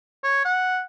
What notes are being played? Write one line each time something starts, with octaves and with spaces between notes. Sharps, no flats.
C#5
F#5